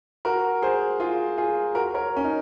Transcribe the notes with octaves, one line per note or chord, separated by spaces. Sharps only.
F#4 A#4
G#4 C5
F4 G#4
F4 G#4
F#4 A#4
A#4 C#5
C#4
D#4